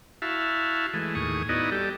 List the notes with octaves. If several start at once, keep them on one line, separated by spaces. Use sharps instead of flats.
E4 F#4 E5 F5 A5
E3 G#3 A3
D#2 A2 G#4 C#6 D#6
B3 D#4 E4 F#4 D5 D#5
G3 G4 A4 D5